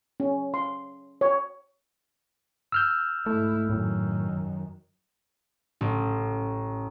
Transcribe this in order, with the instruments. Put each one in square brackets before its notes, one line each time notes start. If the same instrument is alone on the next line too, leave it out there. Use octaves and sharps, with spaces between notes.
[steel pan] C#4
C6
C#5
[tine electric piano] E6 F6 G6
[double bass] G#2 E4 [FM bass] A3
[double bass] F#2 D#3 [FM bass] A2
[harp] A1